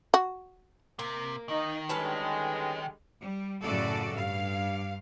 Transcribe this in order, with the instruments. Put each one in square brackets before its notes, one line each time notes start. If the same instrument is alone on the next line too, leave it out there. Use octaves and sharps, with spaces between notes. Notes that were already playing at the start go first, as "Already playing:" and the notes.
[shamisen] F#4
[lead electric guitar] C3 [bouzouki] A#3
[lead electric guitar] D#3 [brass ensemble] D#4
[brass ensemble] D3 G3 G#3 [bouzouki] C#4 B4 A5
[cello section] G3
F#2 A2 C#3 F#4 A4 D5
G2 F5